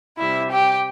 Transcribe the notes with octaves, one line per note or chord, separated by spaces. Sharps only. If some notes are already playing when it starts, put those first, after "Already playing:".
C3 G3 E4 E5
G4 G5